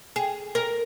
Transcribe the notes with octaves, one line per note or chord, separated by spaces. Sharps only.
G#4
A#4